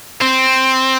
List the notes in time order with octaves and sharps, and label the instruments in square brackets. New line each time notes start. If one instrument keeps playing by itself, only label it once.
[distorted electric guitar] C4